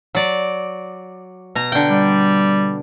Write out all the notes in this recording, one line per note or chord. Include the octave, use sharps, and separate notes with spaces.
F#3 D5
B2 A#5
D3 G5
G3